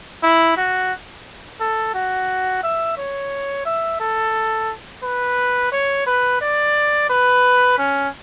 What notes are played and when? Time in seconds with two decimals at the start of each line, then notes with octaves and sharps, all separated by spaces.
0.23 E4
0.57 F#4
1.60 A4
1.94 F#4
2.63 E5
2.97 C#5
3.66 E5
4.00 A4
5.03 B4
5.72 C#5
6.07 B4
6.41 D5
7.10 B4
7.78 C#4